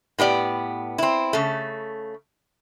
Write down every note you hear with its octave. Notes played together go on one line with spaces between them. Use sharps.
A2 B3 G4 D5
C4 E4
C#3 A3